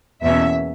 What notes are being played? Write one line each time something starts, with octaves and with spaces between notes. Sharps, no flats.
E2 B2 A#3 C#4 E5